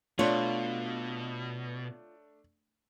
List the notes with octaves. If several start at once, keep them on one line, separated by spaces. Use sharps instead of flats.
B2 A3 D4 F4 C#5